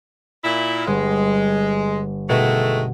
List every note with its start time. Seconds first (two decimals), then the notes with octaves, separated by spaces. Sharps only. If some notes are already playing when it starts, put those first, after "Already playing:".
0.44 A#2 E4
0.87 G1 G#3
2.29 B2 D#3 G#3 A3